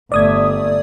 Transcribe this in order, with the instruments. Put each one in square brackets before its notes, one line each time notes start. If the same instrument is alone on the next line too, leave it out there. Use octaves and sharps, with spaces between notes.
[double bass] G1 A3 [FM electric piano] D5 D#6 G#6